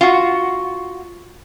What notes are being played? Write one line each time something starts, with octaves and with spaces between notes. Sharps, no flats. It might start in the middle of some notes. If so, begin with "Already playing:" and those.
F4 F#4